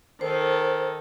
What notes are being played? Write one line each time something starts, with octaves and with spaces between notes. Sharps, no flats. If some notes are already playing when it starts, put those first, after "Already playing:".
D#3 A4 C5